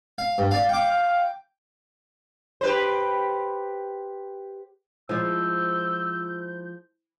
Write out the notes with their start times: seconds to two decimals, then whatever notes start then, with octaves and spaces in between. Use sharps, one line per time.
0.18 F5
0.38 G2
0.51 D5 F5
0.69 F5 G5 D6
2.61 G4 B4 C5
5.09 F3 G#3 E4 C5 E6 G6